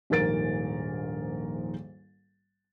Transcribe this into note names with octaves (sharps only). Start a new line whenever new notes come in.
D#1 A#1 G#2 A#4 A6 D7